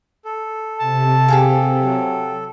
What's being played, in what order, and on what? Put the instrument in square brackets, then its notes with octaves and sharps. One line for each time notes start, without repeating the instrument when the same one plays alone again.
[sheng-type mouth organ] A4
[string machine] C3 [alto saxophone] A5
[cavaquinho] G4 G#4 F5
[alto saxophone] F#3